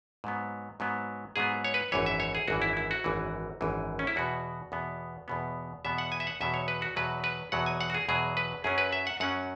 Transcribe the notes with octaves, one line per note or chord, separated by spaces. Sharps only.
G#2 F#3 B3
G#2 F#3 B3
G#2 F#3 B3 G#4
C#5
B4
G#1 F#2 E3 C#5
E5
C#5
G#4
G#1 F#2 E3 F#4
E4
E4
F#4
G#1 F#2 E3
G#1 F#2 E3
C#4
E4
E2 B2 B3 F#4
E2 B2 B3
E2 B2 B3
E2 B2 B3 E5
F#5
G#5
E5
F#5
E2 B2 F#3 E5
C#5
B4
F#4
E2 B2 F#3 B4
B4
E2 B2 F#3 F#5
G#5
F#5
F#4
G#4
E2 B2 F#3 G#4
B4
F#2 F#3 C#4 G#4
B4
E5
F#5
F#2 F#3 C#4 F#5